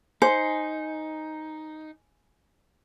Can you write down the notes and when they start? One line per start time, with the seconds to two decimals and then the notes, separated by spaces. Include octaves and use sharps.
0.22 D#4 C5 G#5